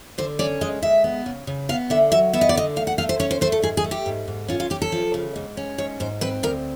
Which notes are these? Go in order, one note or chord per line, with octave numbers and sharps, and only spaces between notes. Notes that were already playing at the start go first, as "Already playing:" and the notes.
D3 C5
C#4 D5
G#3 D#5
G#3 E5
B3
C#3
C#3
B3 F5
D3 E5
F#3 E5
B3 E5
D#5
D5
D3 D#5
A3 F5
F#5
A3 F5
C5
C#4 C#5
C5
A3 C5
A4
G#2 G#4
G#4
A3
G4
G#2
G#2
C#4 F4
F4
C#4 G4
A4
F3
C#3
G#2
C#4
G#2 C#5
G#2 C5
C4 B4
D2 A#4